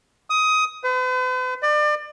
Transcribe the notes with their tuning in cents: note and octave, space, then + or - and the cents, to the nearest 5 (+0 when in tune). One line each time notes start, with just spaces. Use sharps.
D#6 +15
B4 +45
D5 +30